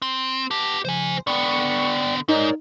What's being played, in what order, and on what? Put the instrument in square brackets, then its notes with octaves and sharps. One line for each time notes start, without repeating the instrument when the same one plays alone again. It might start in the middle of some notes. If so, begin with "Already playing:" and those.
[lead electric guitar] C4
[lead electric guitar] B3 G4 [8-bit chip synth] A5 A#6
[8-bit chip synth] C#3 F3 [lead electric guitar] C5 G#5
[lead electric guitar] D3 B3 [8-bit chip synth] D5 G5 [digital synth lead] C#6
[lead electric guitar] G#2 [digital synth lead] D#4 [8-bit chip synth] A#4 C#5 D5